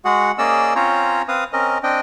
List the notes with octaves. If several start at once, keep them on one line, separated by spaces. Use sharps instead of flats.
G#3 F#4 G#4 F#5
A#3 C#4 G#4 D5 D#5 E6
C4 C#4 F4 C5 C#5 A#5
C4 B4 F5 D#6
C4 C#4 A#4 D#5
C4 D4 D#5 G5